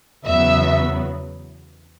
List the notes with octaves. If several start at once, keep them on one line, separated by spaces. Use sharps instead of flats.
E2 C#3 F#3 B3 E5